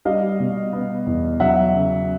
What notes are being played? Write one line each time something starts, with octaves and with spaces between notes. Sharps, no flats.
G3 D#5 F5
B2
B3
E2
F#3 E5 F#5
C#3